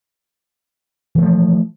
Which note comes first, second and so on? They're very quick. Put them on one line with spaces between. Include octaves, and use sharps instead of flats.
E3 A3 F3